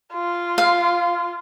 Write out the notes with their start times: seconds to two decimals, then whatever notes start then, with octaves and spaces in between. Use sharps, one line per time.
0.13 F4
0.58 F5